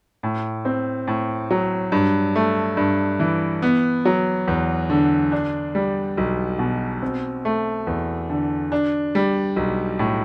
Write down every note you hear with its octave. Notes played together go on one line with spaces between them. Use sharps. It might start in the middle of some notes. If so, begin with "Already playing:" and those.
A2
C4
A2
F#3
G2
A3
G2
E3
B3
F#3
E2
D3
D4
G3
B1
B2
C4
A3
E2
D3
D4
G3
B1
A2